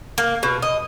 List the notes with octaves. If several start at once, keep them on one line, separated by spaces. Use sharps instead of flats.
A#3
B2
D#5